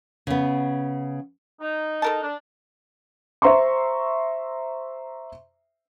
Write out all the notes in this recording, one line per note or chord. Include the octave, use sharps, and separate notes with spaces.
C#3 B3
D#4
A4 A#4 A5
D4
C5 E5 A#5 C6 C#6